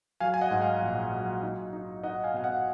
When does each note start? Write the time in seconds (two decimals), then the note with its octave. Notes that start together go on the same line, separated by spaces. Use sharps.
0.20 F#3 F5 G#5
0.34 G#5
0.41 D#5 F#5
0.51 G#2
0.61 F5 G#5
0.82 A#1
1.12 F#3
1.43 D#4
1.73 D#4
2.03 D#4 D#5 F#5
2.24 F5 G#5
2.34 B2 F5
2.44 D#5 F#5